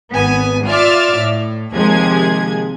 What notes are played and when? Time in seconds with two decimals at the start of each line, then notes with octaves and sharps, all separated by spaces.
0.13 G#1 B3 G#5
0.66 F4 D5 E5 D6 F6 A6
1.19 A2
1.73 D#2 C3 F3 G#3 G#4 G#6